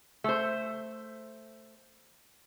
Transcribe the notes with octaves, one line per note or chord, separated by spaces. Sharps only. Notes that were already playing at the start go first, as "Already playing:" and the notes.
A3 C5